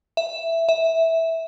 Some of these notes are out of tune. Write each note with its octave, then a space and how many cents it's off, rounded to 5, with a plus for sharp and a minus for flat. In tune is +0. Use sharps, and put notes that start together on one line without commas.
E5 +5
E5 -10